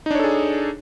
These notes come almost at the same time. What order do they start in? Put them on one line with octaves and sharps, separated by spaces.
D#4 D4 C#5 A4 G#4